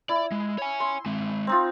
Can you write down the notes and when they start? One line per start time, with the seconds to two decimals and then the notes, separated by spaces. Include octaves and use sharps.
0.09 E4 D5
0.32 G#3
0.58 C#5 G#5
0.80 C6
1.06 G#3 C4
1.47 C4 D#4 F4